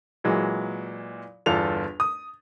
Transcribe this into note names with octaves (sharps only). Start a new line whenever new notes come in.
A#2 E3 F#3 G#3
G1 E2 F4 A4 F7
D#6